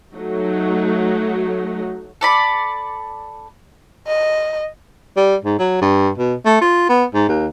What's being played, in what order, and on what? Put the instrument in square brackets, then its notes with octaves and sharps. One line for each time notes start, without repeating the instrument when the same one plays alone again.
[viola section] F#3 A3 D#4
[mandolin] A4 D5 B5
[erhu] D#5
[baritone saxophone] G3
G#2
F#3
G2
B2
A3
F4
B3
G#2
D#2